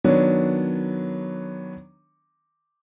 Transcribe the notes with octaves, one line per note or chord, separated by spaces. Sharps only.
D#3 F#3 B3 D4 C#5